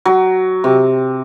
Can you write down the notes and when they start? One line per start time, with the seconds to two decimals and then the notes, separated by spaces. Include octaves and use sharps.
0.05 F#3
0.64 C3